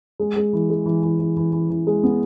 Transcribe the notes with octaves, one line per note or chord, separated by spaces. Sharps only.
G#3
G#3
E3
G#3
E3
E3
E3
E3
E3
E3
G#3
B3